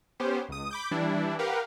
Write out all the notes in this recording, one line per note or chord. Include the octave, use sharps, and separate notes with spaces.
B3 C#4 G4 C5
C#2 D#6
B5 D6 G6
E3 G3 D4 E4
G4 A#4 B4 F5 F#5